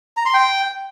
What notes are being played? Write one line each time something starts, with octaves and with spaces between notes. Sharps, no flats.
A#5
C6
G5